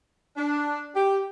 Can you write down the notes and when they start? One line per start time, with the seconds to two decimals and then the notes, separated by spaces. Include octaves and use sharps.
0.36 D4
0.94 G4